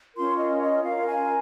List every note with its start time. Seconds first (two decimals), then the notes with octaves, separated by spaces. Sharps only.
0.15 C#4 F4 A#4 C6
0.37 D#5
0.60 D#5
0.83 C#4 F4 A#4 F5
1.06 G#5